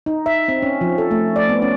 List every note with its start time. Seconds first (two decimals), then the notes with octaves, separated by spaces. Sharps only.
0.06 D#4
0.26 E5
0.48 C4
0.62 C#4
0.81 F3
0.98 A4
1.11 A3
1.36 D5
1.49 B3
1.62 C#4